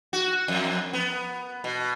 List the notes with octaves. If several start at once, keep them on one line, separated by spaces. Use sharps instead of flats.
F#4
F2
B3
B2